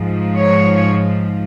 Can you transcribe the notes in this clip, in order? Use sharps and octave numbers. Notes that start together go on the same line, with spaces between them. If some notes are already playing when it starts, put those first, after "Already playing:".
Already playing: G#2 F3
C#5